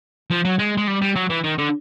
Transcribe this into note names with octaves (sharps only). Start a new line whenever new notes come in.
F3
F#3
G#3
G#3
G3
G3
F#3
E3
D#3
D3